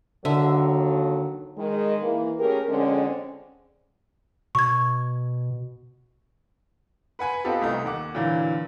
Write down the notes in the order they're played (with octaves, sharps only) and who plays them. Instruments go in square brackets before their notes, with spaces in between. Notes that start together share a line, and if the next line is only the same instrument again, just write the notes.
[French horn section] D#2 F#3 A4 [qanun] D3 E5
[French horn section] D#3 G#3
E3 A#3
A3 C#4 G4 G#4 A#4
F2 D3 G#3 C4 C#4
[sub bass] B2 [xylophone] C#6 G#6
[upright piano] B4 F#5 G#5 B5
B3 C4 D#4 F4 G4 A4
C2 A3 D#4
D#2 F#5 D6
A#2 D3 E3 F#3 A#3